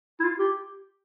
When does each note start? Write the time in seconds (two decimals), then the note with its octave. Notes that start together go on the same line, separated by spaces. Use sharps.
0.20 E4
0.24 F4
0.39 G4